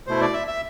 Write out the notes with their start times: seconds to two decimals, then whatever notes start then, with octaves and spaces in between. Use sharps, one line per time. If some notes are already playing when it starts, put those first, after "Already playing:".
0.07 B2 A3 E4 C5
0.21 D5
0.34 E5
0.47 E5